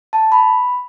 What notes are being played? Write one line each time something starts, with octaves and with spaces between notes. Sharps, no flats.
A5
B5